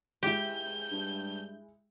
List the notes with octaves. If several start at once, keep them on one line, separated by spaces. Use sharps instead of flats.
G#3 E4 G4 G6
G2